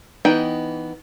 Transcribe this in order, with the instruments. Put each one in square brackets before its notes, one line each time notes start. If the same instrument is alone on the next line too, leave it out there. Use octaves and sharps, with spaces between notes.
[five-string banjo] E3 B3 D#4 G5